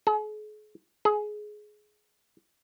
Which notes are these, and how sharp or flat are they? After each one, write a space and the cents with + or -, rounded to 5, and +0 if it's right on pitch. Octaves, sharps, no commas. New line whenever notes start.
G#4 +45
G#4 +20